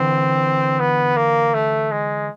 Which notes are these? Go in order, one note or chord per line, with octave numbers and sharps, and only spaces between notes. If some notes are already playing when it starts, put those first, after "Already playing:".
Already playing: D3 E3 C4
B3
A#3
A3
G#3